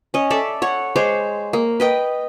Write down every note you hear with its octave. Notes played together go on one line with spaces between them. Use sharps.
C#4 D#5
A4 D5 E5
C#5 F#5
G#3 C5 C#5 D6
A#3
B4 D#5 G5